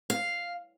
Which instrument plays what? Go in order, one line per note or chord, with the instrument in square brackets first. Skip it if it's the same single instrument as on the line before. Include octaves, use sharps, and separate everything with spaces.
[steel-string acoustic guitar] F5